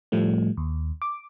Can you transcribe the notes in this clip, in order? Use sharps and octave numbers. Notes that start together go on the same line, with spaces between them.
A2 F3 G3 A3
D#2
D6